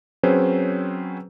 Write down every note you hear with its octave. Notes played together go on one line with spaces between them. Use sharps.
F#3 C4 C#4 G#4 B4 C5